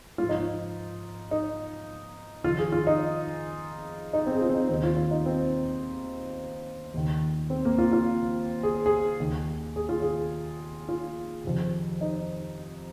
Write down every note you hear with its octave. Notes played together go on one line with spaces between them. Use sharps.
G#2 F3 F4
D#4
F4
D#4
F2 D#3 F4
G#4
F4
D#4
D#4
C4
G#4
F4
C4
D#4
D#2 D#3 C4
F4
F4
D#4
C4
D#2 D#3
C4
A#3
F4
F4
G#4
G#4
D#2 D#3
G#4
F4
G#4
F4
F2 C3 D#3
D#4